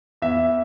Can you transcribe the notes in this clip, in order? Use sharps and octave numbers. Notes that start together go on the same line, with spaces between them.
E2 E5